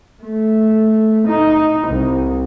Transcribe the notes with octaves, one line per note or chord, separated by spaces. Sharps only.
A3
D#4
C2